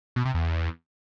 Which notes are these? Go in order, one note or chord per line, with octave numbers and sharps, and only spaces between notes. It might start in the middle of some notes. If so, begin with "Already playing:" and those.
B2
C3
E2